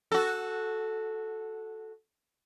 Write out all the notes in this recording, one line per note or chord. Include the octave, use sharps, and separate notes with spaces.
F#4 A4